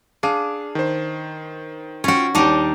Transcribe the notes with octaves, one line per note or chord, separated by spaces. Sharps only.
D4 G#4 F5 D#7
D#3 C5
C#4 F4 F#4 G5
D#2 G3 D4 D#4 G4